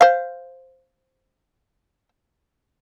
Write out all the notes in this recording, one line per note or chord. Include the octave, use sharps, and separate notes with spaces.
C5 F5